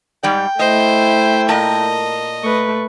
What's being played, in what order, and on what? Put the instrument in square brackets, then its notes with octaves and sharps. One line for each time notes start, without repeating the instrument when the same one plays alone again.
[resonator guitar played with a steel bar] G#2 G3 D5 [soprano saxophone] G5
[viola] A3 E4 [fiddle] C5 [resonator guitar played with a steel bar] D#5
[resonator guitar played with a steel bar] A#2 A#4 A5 [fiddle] D#5
[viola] A3 B4 [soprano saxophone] C#6